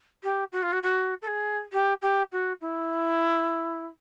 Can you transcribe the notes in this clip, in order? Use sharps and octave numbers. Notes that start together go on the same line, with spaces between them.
G4
F#4
F4
F#4
F#4
A4
G#4
G4
G4
F#4
E4